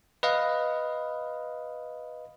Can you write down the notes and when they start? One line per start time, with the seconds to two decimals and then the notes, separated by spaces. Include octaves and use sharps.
0.23 B4 D#5 F5